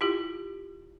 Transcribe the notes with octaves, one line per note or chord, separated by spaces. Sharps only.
E4 F4 G4